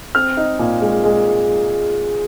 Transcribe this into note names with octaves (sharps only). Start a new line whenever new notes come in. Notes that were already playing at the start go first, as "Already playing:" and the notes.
C4 F6
D#4
A#2
G#3
G#3